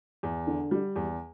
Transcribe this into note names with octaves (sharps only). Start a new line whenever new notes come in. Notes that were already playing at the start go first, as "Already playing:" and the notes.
E2
D3
G3
E2